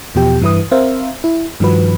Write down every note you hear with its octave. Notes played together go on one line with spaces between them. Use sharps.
E2 B2 F3 G4 G5
G2 E3 E4 B4 D#6
C4 A#4 C5 E5 F5
E4
G2 D#3 F3 F#4 B4